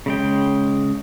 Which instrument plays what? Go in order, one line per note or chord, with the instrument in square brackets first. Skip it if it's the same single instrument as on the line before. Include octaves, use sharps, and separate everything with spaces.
[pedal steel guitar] C#3 G#3 G5